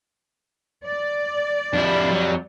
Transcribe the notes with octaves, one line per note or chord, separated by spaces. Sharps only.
D5
F2 G3 D4 E4
F#3